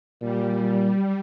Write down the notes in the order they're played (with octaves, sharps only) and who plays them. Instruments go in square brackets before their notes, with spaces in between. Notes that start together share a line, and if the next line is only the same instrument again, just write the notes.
[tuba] A#2 [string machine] G3